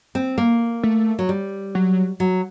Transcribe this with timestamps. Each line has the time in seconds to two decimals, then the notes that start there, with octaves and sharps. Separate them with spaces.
0.15 C4
0.38 A#3
0.83 A3
1.19 F#3
1.29 G3
1.75 F#3
2.20 F#3